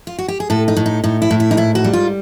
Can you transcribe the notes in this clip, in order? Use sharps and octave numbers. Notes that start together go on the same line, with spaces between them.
F4
F#4
G4
G#4
A2 A4
D#4
A2
D#4
A2 D#4
E4
A2
E4
D#4
G#2 E4
F#4
G3
F4